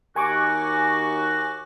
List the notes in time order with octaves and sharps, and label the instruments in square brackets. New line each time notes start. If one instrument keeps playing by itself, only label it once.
[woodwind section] D#2 F#4 [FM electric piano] G#5 C#6 D6